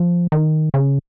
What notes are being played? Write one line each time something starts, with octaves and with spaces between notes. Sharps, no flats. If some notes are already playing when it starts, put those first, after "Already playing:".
Already playing: F3
D#3
C#3